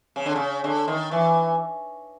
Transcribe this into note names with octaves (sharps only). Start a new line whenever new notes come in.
C#3
D3
C#3
D3
D#3
E3